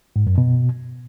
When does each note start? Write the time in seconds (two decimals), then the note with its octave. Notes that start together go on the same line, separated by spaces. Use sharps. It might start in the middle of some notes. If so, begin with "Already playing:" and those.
0.16 G#2
0.27 F#2
0.38 B2